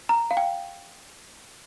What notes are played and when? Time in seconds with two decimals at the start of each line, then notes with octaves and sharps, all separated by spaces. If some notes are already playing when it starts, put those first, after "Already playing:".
0.09 A#5
0.31 F5
0.37 G5